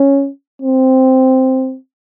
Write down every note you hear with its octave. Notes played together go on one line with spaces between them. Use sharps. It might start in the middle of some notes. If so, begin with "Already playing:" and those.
Already playing: C#4
C4